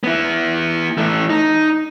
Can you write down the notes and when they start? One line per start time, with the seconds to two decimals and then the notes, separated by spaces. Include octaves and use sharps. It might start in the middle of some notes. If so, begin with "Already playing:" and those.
0.04 B3 E4
0.98 E3 A3
1.30 D#4